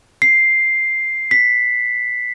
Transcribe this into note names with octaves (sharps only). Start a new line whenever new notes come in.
C7
B6